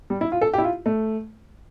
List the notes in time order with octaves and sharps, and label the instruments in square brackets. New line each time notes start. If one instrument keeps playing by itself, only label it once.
[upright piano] G3
E4
F4
A4
G4
E4
F4
A3